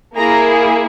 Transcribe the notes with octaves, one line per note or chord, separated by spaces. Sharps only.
A#3 E4 G#4 A#5